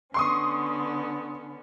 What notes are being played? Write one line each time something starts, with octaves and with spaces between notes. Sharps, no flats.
D3 B3 C#4 C6 C#6 D#6